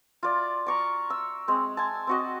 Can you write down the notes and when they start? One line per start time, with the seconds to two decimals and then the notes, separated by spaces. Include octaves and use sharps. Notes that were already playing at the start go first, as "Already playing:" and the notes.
0.23 F4 D5
0.66 A#5 C#6 D6
1.10 E6
1.48 G#3 C4
1.77 G#5 A5
2.07 C4 F#4 D#5